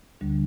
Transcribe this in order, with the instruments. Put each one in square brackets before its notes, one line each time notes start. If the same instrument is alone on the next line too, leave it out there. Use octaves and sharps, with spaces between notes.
[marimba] D2 D3 G3 D4